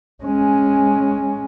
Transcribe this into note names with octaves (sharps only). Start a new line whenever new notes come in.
G#3 C#4